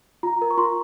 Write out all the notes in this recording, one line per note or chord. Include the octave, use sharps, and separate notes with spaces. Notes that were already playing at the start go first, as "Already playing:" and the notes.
F4 A#5
A#4
C#6
F4 C6